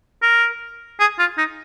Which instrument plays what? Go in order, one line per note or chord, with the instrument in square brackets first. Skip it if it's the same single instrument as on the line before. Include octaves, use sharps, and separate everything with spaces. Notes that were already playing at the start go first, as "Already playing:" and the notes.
[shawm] A#4
G#4
F4
D#4